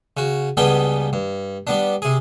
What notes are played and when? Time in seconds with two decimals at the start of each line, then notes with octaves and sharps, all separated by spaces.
0.17 C#3 F#4
0.57 C#2 G3 B3 G#4 G5 A5
1.13 G2
1.67 G3 B3 D4
2.02 C3 G#4